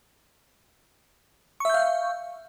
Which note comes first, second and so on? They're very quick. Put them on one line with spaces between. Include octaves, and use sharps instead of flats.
C#6 E5 G6 F5